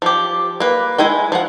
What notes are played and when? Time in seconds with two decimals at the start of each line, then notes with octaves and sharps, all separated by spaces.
0.02 F3 G4
0.60 A#3 B4
0.98 G#3 E4 G#4 G5
1.32 F3 F#5